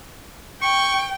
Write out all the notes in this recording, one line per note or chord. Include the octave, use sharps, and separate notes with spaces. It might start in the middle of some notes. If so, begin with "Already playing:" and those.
G5 C#6